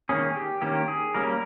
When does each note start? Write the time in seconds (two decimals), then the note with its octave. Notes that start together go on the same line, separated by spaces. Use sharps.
0.09 D#3 A#3 C#4 G#4
0.35 G4
0.62 D#3 A#3 C#4 G4
0.88 G#4
1.14 G3 A#3 C#4 A#4